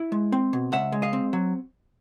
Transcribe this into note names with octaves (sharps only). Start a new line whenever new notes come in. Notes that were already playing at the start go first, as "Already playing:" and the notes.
Already playing: E4
G#3
C4
B2
C#2 E5 F#5
G#3
D#5 F5
C4
F#3